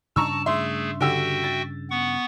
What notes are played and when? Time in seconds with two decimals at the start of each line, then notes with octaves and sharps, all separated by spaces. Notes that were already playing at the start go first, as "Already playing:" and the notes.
0.16 G2 C#3 D4 A5 A#5 C#6 E6
0.46 A3 G#4 E5 C6
1.01 D3 F#4 G4 E5 G5 E6
1.44 A6
1.91 B3 F#5 C#6